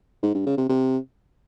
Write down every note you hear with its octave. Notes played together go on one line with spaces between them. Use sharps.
G#2
G2
C#3
C3
C3